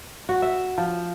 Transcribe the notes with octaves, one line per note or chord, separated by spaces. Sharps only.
F#4
E5
F3